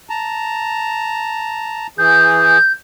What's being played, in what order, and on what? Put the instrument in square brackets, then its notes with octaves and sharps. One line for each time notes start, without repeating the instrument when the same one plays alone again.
[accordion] A5 A#5
[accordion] E3 G#4 [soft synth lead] G6